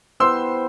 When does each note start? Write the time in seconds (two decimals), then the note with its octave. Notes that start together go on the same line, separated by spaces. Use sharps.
0.20 B3 E4 G4 C5 C6 E6